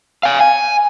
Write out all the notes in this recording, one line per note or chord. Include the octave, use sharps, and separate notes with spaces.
F5 G#5
G#5